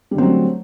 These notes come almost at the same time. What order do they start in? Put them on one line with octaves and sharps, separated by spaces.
G3 D3 C4 F#3 A3